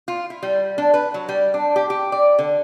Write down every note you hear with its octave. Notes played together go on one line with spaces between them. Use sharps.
F4
E4
G3
D4
B4
F#3
G3
D4
G4
G4
D5
D3